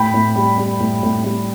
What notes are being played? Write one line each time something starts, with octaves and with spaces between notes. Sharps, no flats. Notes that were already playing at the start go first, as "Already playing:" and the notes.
Already playing: A2 G5 B5
A2
G3
G3
A2
A2
G3